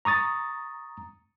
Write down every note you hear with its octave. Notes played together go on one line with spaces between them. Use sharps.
A#5 C#6 D#6 A6